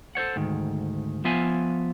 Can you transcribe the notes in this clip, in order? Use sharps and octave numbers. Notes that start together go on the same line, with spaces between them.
A4 C5 C#5 F#5
D2 G#2 D#3
F3 B3 F4 E5 F5 G#5